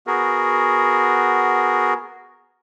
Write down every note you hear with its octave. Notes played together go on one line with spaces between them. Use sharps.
B3 F#4 G#4 A#4